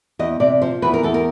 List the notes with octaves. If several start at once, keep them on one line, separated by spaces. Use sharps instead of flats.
E2 D#5
C3 D5
F3 C5
E2 B4
A#4
E2 A4
A#4